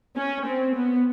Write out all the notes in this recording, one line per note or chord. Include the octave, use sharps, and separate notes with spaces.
C#4
C4
B3